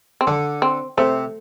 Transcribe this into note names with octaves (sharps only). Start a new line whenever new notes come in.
C4
D3 D4
C4
C3 A3